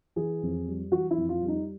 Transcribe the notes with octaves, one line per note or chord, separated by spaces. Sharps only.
E3 G#4
F2
G3
E3 F#4
E4
F2
F4
G3
D#4